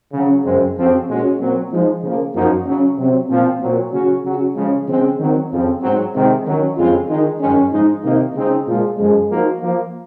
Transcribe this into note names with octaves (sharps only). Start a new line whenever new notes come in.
C#3 F#3 C#4
F#2 C#3 G#3 C4
F2 C#3 F3 C4 F#4
A#2 G#3 C#4 F#4
A#2 F#3 C4
F3 G#3 D#4
C#3 F3 A#3
F#2 F3 A#3 D#4 F#4
C#3 F#3 C#4
C3 F#3 C4
A#2 F3 C4
A#2 F#3 C4
C#3 F#3 C#4 F#4
C#3 F#3 C#4 F#4
C#3 F3 G#3
C#3 F3 G#3 C4
D#3 F#3 C4
F2 C#3 F3 C4
G#2 F#3 C4
C3 D#3 G#3
D#3 F#3 C#4
F2 C#3 G#3 C4 F4
D#3 G#3 D#4
F#2 D#3 G#3 C#4
G#2 F3 G#3 D#4
C3 D#3 A#3 D#4
C#3 G#3 C4 D#4
A#2 F3 G#3
F#2 C#3 F3 G#3
F3 A#3 D#4 F#4
F3 A#3 F4